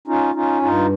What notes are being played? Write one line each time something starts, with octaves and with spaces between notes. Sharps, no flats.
C#4 D#4 F4
C#4 D#4 F4
G2 D#4 F4